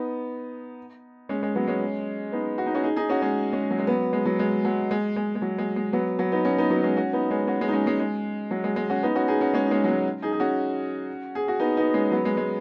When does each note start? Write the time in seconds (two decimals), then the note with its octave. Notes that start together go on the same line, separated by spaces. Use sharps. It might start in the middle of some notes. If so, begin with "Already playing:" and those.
Already playing: B3 D#4
1.29 G#3 C#4
1.43 G#3
1.55 F#3 B3
1.68 G#3 C#4
2.32 B3 D#4
2.58 F#4
2.66 D#4
2.75 C#4 F#4
2.83 D#4 G#4
2.96 D#4 G#4
3.09 C#4 F#4
3.22 G#3 C#4
3.53 G#3 C#4
3.71 F#3
3.79 G#3
3.87 F#3 B3
4.13 G#3
4.26 F#3
4.39 G#3
4.65 F#3
4.91 G#3
5.16 G#3
5.35 G#3
5.42 F#3
5.58 G#3
5.76 G#3
5.93 F#3 B3
6.19 F#3 B3
6.32 B3 D#4
6.45 C#4 F#4
6.58 B3 D#4
6.70 F#3 B3
6.83 G#3 C#4
6.97 C#4 F#4
7.13 B3 D#4
7.31 G#3 C#4
7.47 C#4 F#4
7.61 G#3 C#4
7.68 D#4
7.73 G#3 C#4
7.86 G#3 C#4
7.99 G#3
8.51 F#3
8.64 G#3
8.76 G#3
8.90 C#4 F#4
9.03 B3 D#4
9.15 C#4 F#4
9.28 D#4 G#4
9.41 C#4 F#4
9.53 G#3 C#4
9.66 D#4
9.71 G#3 C#4
9.84 F#3
9.88 G#3
10.22 D#4 G#4
10.33 G#4
10.40 C#4 F#4
11.35 G#4
11.48 F#4
11.60 B3 D#4
11.77 B3 D#4
11.94 G#3 C#4
12.11 F#3 B3
12.25 G#3
12.37 G#3